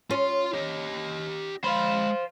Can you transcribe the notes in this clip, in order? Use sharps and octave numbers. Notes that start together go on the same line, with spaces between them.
C#4 F4 C6
G4 D#5
G#3 C5 F5 B5